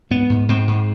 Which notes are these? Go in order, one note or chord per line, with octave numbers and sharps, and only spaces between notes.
G#2 B3
G#2
G#2 C4
G#2